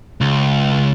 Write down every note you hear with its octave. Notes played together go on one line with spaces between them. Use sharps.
C#2